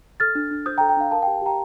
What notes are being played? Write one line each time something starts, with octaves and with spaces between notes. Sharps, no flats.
A4 F6 A6
D4
D4
C5 D#6 G6
G5 A#5
A4
G5
D4 F5
A#4 F5 A5
G5
G4
G4 G5 A#5